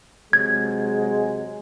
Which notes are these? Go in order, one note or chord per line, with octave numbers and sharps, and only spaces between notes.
C3 F#3 G#3 G#6